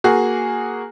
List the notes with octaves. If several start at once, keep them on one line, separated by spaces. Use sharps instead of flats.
A#3 F#4 G#4